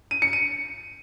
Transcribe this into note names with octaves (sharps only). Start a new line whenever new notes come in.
D#7
C#7
D#7